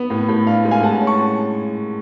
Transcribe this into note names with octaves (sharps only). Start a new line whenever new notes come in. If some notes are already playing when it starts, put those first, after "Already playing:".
Already playing: B3
A2
A2
D4 F5
G#3
F5 G#5
A2 F#5 A5
C#4
A5 C#6